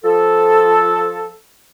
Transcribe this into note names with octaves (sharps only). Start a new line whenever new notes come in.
F3 A4